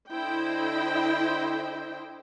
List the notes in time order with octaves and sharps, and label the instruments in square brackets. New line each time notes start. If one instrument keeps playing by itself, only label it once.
[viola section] D3 E4 C5 D#5 G5